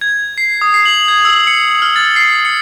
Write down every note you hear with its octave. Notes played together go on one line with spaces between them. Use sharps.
G#6
C7
D#6
C7
F#7
G#6
E6
C#7
F6
A6
C7
C#7